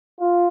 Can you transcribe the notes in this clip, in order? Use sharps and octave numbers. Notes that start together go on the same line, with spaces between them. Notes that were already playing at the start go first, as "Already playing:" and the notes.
F4